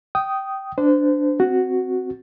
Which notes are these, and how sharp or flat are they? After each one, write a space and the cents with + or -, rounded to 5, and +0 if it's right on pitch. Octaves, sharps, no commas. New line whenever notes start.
G5 -15 D#6 +0
D4 +0 C5 -30
C4 -5 F#4 +0